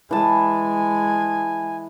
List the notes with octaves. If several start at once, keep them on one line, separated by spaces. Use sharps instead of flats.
E3 G#3 G#5 A5